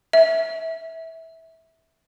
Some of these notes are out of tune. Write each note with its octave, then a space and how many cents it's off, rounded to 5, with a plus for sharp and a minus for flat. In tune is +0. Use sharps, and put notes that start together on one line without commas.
E5 -15